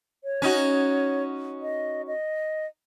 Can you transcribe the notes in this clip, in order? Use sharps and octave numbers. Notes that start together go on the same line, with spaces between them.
C#5
C#4 D#4 F#4
D#5
D#5